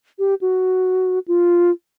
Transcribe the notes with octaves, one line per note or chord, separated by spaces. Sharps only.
G4
F#4
F4